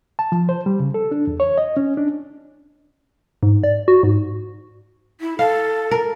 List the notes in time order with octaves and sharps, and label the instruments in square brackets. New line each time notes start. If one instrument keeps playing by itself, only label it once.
[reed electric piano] A5
F3
C5
G3
C#3
A4
D4
E2
C#5
D#5
C#4
D4
[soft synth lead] G#2
D5
F#4
G#2
[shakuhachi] E4
[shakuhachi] A4 [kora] F5
[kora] A#4